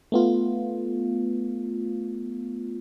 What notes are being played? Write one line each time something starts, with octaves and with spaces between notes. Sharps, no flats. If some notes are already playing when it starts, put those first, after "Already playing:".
A3 B3 F4